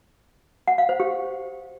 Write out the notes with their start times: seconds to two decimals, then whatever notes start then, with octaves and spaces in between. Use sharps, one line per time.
0.68 F#5
0.78 F5
0.89 C5
1.00 G4